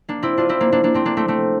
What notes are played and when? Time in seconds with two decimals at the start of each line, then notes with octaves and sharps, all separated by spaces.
0.09 A#3 D4
0.23 C4 E4
0.37 D4 F4
0.49 C4 E4
0.60 A#3 D4
0.72 A#3 D4
0.84 A#3 D4
0.94 A3 C4
1.05 A#3 D4
1.17 A3 C4
1.28 A3 C4